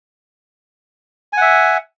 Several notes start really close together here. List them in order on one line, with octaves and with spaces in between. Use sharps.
G#5 F#5 E5